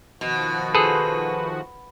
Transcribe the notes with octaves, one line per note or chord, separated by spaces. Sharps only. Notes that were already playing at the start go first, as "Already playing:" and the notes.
B2 D#3 F3 F#4
G#4 A4 B4 C5